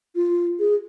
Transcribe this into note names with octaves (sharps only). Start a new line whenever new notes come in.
F4
G#4